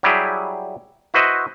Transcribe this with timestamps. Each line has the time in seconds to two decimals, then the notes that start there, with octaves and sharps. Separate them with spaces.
0.03 F#3 G3 E4 G4 G#4
1.14 E4 F#4 B4 C5 D#5 E5